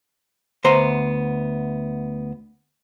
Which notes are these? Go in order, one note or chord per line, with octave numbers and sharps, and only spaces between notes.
D2 B3 C5 A#5